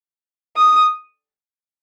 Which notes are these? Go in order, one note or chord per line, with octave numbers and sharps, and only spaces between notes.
D#6